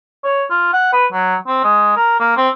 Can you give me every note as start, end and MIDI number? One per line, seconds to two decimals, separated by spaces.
0.24 0.45 73
0.50 0.73 65
0.73 0.92 78
0.93 1.06 71
1.13 1.35 54
1.47 1.61 60
1.64 1.93 56
1.97 2.15 70
2.20 2.34 58
2.37 2.49 60